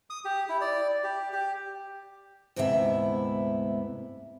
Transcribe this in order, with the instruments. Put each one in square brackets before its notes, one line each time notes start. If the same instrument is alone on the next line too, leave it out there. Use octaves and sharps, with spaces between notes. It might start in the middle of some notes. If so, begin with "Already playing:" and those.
[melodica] D#6
G4
E4
D5
G4
G4
[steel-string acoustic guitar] D2 G#2 C3 B3 E4 E5